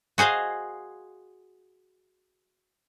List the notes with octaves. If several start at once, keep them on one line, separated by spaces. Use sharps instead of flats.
F#4 G#4 C5 D#5 F5